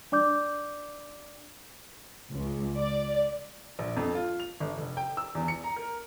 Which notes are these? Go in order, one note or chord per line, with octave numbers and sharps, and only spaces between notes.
D4 D5 D6 G6
C#2
D5
A#1
F2
F4
F7
G1
F1
G5
E6
E2
C#7
A#5
A#4